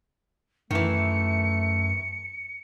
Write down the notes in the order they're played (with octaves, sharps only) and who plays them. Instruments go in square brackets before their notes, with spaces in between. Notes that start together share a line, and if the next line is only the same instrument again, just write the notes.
[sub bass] F#2 [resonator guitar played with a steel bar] D#3 E3 [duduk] A3 [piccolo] C#7